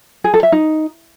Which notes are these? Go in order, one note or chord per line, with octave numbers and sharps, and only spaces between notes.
G#4
A4
E5
D#4